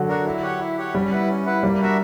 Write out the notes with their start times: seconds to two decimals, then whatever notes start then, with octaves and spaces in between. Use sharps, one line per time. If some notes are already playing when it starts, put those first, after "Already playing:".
Already playing: D3 F#3
0.08 D4 F#4 A#4
0.25 E4
0.43 G4 C#5 F#5
0.60 E4
0.77 G4 C#5 F#5
0.94 G3 C#4
1.11 E4 B4 F#5
1.29 C#4
1.46 E4 B4 F#5
1.63 G3 A#3
1.80 D4 F#4 A#4 E5